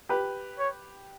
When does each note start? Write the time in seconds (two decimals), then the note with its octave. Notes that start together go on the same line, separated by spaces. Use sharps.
0.09 G4 B4
0.59 C#5